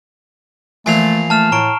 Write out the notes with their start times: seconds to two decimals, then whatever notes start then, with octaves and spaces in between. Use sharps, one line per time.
0.86 A#2 E3 F3 A3 G#5 C7 F7
1.30 A3 A5 F6 E7
1.52 A2 A#5 C#6 D7